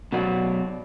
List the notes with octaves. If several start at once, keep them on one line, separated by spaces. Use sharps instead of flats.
B2 F#3 D5